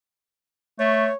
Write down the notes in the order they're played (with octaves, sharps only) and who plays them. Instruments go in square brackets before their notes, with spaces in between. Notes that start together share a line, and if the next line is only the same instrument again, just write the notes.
[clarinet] A3 [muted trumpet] C#5